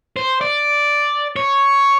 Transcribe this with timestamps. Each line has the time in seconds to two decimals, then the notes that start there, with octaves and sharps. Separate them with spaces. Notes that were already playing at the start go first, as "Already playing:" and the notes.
0.16 C5
0.41 D5
1.36 C#5